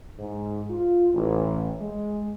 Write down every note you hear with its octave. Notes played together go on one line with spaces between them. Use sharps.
G#2
F4
A1
G#3